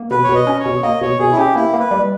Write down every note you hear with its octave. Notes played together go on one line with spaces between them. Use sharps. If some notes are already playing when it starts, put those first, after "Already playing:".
Already playing: A#3
B2 B4
C#5
B2
D#5
C#4
C#5
B2
A#3 D#5
B2 C#5
B2 G#4
E4
C#4 G4
A#3 E4
A#3
B4
G3